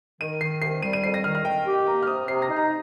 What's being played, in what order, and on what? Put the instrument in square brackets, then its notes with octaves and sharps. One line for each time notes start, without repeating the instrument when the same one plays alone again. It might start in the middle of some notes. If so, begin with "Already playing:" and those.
[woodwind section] D#3 [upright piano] D#7
[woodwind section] D#3 [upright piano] C7
[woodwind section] C2 [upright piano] C7
[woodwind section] G3 [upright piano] D#7
[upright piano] D#7
[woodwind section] F2 [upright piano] C7
[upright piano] A#6
[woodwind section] D#3 [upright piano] F6
[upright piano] F6
[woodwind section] D#3 [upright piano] G5
[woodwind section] G4
[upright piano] G5
[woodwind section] A#3 [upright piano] A#5
[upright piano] F6
[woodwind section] C3 [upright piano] D#6
[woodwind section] C3 [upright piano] C7
[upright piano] A#6
[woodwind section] D#4
[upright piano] A#5